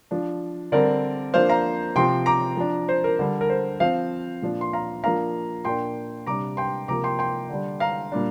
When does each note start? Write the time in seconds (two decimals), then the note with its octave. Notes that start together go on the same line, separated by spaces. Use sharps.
0.11 F3 D4
0.72 D3 G3 C4 A#4 D5
1.34 F3 A#3 D4 C5 F5
1.49 F5 A#5
1.96 C3 F3 C4 G5 C6
2.26 A#5 D6
2.57 F3 D4
2.89 C5
3.04 A#4
3.19 D3 G3 D4
3.41 A#4
3.50 C5
3.80 F3 C4 C5 F5
4.42 A#2 F3 D4
4.61 C6
4.73 F5 A#5
5.03 F3 A#3 D4 F5 A#5
5.65 A#2 A#3 D4 G5 C6
6.27 C3 G3 D4 A#5 D6
6.57 G5 C6
6.88 C3 F3 A#3 A#5 D6
7.04 G5 C6
7.19 G5 C6
7.49 D3 G3 D4
7.80 F5 A#5
8.12 A#2 G3 D4